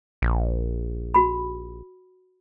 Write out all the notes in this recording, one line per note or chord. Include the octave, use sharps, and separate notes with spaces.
A#1
F#4 B5